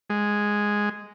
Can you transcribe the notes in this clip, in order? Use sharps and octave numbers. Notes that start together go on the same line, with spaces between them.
G#3